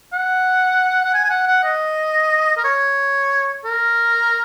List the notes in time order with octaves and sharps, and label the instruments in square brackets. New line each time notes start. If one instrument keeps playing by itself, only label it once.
[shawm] F#5
F#5
G#5
G#5
F#5
F#5
D#5
A#4
C#5
A#4